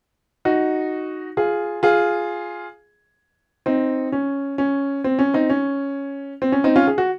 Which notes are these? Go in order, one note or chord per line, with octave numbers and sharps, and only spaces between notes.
D#4 F#4
F4 G#4
F4 G#4
C4 D#4
C#4
C#4
C4
C#4
C4 D#4
C#4
C4
C#4
C4 D#4
C#4 F4
G#4
F#4